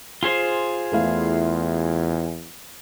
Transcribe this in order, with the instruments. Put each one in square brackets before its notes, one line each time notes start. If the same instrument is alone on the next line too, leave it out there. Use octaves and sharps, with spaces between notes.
[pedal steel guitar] F4 G#4 C5
[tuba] E2 [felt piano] A3 E4 F5